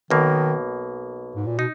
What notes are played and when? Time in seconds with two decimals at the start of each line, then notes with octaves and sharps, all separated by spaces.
0.10 B1 B2 D#3 A#3
1.35 G#2
1.47 A#2
1.58 B2 D#4